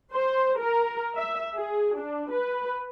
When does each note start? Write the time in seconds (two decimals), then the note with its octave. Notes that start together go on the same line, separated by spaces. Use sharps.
0.13 C5
0.59 A#4
1.16 E5
1.57 G#4
1.97 D4
2.31 B4